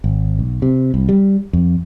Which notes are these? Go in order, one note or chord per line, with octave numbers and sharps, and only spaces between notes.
G#1
B1
C3
C2
G3
F2